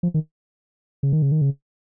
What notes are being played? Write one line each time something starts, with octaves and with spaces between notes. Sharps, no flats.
F3
D#3
C#3
D#3
C#3
D#3
C#3